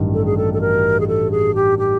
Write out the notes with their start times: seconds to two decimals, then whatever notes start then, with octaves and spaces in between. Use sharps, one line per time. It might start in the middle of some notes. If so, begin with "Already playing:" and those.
Already playing: A1 G2 D#3 F#3
0.14 A4
0.25 G#4
0.37 A4
0.54 A4
0.61 A#4
1.00 G#4
1.08 A4
1.31 G#4
1.55 G4
1.79 G4